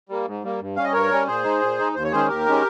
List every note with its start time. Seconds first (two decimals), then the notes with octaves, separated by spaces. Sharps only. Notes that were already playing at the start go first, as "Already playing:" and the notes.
0.09 G3 A#3
0.26 G#2
0.43 G3 A#3
0.60 G2
0.76 G3 C#4 F5
0.84 D#5
0.93 G2 A#4 C#5
1.11 G3 C#4
1.27 A#2 G#4 C5
1.44 G#3 D#4
1.62 A#2
1.78 G#3 D#4
1.95 D#2 C5
2.04 C#5
2.12 D#3 G#3 C#4 G#4 C5
2.29 D#2 G4 A#4
2.46 D#3 G#3 C#4